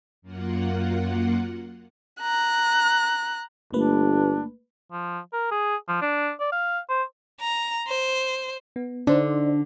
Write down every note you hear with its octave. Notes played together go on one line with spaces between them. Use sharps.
F#2 A#3 F4 F#5
A#5 F#6
G1 A3 A#3 D4 B4
F3
A#4
G#4
F3
D4
D5
F5
C5
A#5
C5
B3
D3 D4 D#4 C5 D5